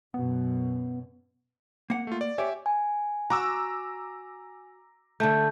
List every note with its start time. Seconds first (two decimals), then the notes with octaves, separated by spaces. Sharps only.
0.14 F#2 B2 B3
1.90 A#3 F#5
2.07 A3 F4
2.21 D5
2.38 G4 C#5 D5 E5 G#5
2.66 G#5
3.30 F#4 A#5 D6 E6
5.20 D3 A3 A5 G6